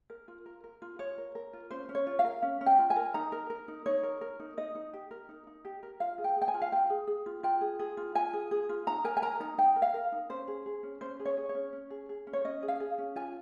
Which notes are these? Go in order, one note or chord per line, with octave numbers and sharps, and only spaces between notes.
A#4
F4
A#4
A#4
F4
F4 C#5
A#4
A#4
F4
C#4 C5
C#4
C#5
F4
F5
A#4
C#4
C#4
G5
F4
G#5
A#4
D#4 A#5
A#4
A#4
D#4
D#4 C#5
A#4
A#4
D#4
D#4 D#5
D#4
G4
A#4
D#4
D#4
G4
A#4
F4 F5
G#4
G5
G#4
G5
G#5
F4
F5
F4 G5
G#4
G#4
F4
F4 G5
G#4
G#4
F4
F4 G#5
G#4
G#4
F4
D#4 A#5
A#4 G#5
G#5
A#4 A#5
D#4 A#5
D#4 G5
A#4
F5
A#4
D#4
C#4 C5
G#4
G#4
C#4
C#4 C5
G#4
C#5
G#4
C#5
C#4
C#4
G#4
G#4
C#4
C#5
C#4 D#5
G#4
F5
G#4
C#4
F4 G#5